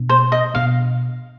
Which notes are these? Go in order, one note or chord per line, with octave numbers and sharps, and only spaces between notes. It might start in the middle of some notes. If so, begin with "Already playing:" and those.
Already playing: B2 B3 D4
C5
D#5
B2 B3 D4 F5